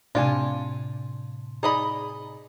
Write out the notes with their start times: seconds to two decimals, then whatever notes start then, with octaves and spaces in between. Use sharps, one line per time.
0.15 A2 C3 D4 F4 G4 D5 G#5
1.63 D#4 G#4 D5 D#5 B5